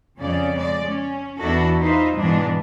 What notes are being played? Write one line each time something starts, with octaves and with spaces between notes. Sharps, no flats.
F2 C#3 C#4 D5
G#3 D5
C#4
E2 D4 E4 F#4 A4
D#4 F4 B4 C5 E5
G#2 B2 E3 G#3 D4